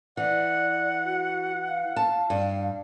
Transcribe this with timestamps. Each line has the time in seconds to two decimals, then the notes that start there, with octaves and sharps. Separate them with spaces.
0.17 E3 D5 F#5
1.04 F#4
1.68 F5
1.96 A5
2.30 G2